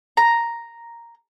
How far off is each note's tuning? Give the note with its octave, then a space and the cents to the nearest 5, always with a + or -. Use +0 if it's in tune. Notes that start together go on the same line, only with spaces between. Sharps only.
A#5 +0